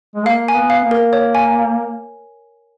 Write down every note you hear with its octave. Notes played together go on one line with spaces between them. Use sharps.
G#3
A#3 F5
G#5
B3
F5
A#3
A#4
C#5
G#5